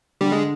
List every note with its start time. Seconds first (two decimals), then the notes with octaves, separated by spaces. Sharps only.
0.21 D3 G3
0.32 G#3